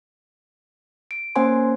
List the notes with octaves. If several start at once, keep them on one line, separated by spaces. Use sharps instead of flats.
D7
A#3 C#4 C5 F#5 G#5 C6